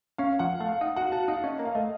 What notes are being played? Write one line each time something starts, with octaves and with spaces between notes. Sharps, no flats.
C#4 F5
F3 F#5
A3 F5
F5
D#4 F#5
F#4 F#5
F#4 A5
D#4 F5
C#4 D#5
A#3
F5
A3 D#5